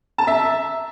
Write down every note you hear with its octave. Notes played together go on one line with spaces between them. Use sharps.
E5 A5 A#5